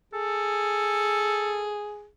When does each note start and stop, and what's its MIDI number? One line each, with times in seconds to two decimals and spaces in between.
0.13 2.08 68
0.13 1.77 69